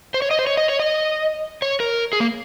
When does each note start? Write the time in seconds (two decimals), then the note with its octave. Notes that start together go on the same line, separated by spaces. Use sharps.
0.14 C5
0.22 C#5
0.31 D#5
0.39 C5
0.47 C#5
0.57 D#5
0.69 C#5
0.80 D#5
1.62 C#5
1.80 A#4
2.13 G#4
2.20 A#3